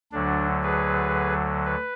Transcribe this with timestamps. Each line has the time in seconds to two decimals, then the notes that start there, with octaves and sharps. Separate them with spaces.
0.12 D2 D3 F#3 D4
0.63 G#4 B4
1.65 B4